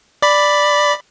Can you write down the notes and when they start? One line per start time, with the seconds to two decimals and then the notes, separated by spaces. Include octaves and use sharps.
0.22 D5 B5